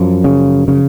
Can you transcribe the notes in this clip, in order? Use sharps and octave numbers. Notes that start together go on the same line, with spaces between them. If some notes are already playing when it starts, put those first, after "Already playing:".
Already playing: F#2 F3
C#3
C#3